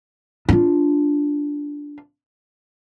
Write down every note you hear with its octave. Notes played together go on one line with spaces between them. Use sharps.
D4 F4